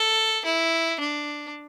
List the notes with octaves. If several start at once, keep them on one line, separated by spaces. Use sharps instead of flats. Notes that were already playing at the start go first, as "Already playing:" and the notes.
Already playing: A4
E4
D4